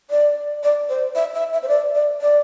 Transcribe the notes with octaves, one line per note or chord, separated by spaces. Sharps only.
D5
D5
C5
E5
E5
E5
C5
D5
D5
D5